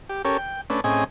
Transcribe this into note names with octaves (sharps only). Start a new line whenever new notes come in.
G4
C#4 G4 A4 A#4 C#5
G5
A3 C#4 D4 B4
A2 C4 C#4 G#4 D#5 G#5